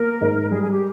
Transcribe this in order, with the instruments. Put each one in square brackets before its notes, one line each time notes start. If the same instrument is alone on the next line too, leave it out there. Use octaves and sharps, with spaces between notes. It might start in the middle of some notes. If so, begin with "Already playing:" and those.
Already playing: [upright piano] A#3 [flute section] A#4
[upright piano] G#2
[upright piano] G3 [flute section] G#4
[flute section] G#4
G4